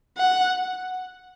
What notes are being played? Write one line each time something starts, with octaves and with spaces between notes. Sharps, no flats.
F#5